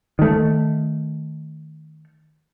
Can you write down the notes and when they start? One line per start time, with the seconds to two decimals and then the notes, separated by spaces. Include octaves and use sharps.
0.19 D#3 A3